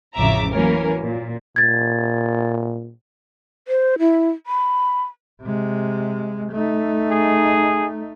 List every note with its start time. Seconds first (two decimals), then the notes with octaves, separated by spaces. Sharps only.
0.16 A1 F2 C#3 E5 A#5 D6
0.52 E3 F#3 A#3 C#4 A#4
1.04 A#2
1.56 A#2 G#6 A6
3.68 C5
3.99 E4
4.47 B5
5.42 C3 G#3
6.52 A3 D#4
7.10 G#4